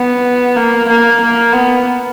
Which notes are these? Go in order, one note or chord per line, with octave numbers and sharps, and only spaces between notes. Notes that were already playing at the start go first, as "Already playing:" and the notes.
Already playing: B3
A#3
A#3
A#3
B3